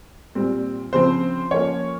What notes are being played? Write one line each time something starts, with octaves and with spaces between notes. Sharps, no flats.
A#2 G3 C4
C#3 F3 C4 C5
F3 A#3 C#4 C#5